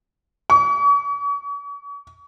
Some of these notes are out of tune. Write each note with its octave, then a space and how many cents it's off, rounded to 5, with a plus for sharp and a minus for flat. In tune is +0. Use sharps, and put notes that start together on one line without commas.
C#6 +40